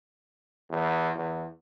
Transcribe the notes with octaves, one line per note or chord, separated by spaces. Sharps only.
E2
E2